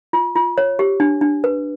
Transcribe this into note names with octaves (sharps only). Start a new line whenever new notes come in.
F4
F4
C#5
G4
D4
D4
B4